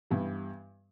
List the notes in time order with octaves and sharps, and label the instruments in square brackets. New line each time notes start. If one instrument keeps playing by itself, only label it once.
[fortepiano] G2 E3 G3 B3